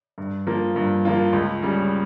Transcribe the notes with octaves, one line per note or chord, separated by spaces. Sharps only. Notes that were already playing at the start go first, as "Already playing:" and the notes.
G2
F3 A#3 F4
G2
F3 A#3 F4
C#2
C#3 G3